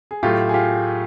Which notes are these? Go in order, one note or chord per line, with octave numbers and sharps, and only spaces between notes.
G#4
A2 F#3 A3 F4 G4
G#4
F4 G4